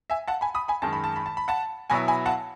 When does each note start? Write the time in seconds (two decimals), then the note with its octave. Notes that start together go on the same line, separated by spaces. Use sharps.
0.10 E5 G#5
0.28 F#5 A5
0.41 G#5 B5
0.55 B5 D#6
0.68 G#5 B5
0.82 F#2 D#3 G#3 A5
0.93 B5
1.04 A5
1.16 B5
1.26 A5
1.37 B5
1.48 F#5 A5
1.90 B2 F#3 B3 E4 G#5 B5
2.08 G#5 B5
2.26 F#5 A5